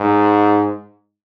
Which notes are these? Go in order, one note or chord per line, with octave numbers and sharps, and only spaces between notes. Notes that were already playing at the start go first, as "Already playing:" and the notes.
Already playing: G#2